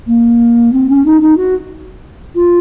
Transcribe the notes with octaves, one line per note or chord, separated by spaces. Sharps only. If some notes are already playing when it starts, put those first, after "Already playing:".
A#3
C4
C#4
D#4
D#4
F#4
F4